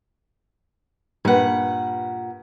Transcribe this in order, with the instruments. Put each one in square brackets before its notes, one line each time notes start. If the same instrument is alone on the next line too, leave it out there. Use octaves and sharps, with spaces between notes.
[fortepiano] G2 B4 [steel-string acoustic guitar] A#2 F#5